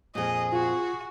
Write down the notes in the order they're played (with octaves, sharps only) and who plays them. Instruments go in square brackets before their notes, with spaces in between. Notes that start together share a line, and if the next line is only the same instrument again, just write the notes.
[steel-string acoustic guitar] F2 A#2 [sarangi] G#4 [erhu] D#5
[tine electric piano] F4 [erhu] F#4